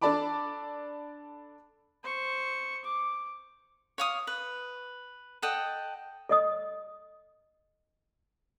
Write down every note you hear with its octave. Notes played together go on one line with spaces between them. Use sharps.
D4 A4 D5 A5 B5 D6
C5 C#6
D6
C#5 F5 D#6
B4
A4 D#5 F#5 G5
A4 D#5 D#6